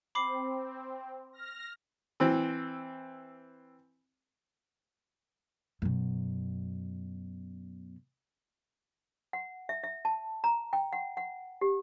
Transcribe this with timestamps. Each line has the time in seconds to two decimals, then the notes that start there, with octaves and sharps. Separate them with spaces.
0.15 C4 B5 D6 C7
1.33 F6 A#6
2.20 E3 C4
5.82 F#2 B2
9.33 F#5
9.69 E5
9.83 E5
10.05 A5
10.44 A#5
10.73 G5
10.93 F#5
11.17 F#5
11.61 G4